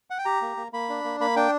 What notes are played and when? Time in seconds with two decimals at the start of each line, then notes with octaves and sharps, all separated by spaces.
0.10 F#5
0.18 G5
0.25 G4 A#5
0.42 A#3
0.57 A#3
0.73 A#3 B5
0.89 D4
1.04 A#3
1.20 A#3 B5
1.36 D4 G5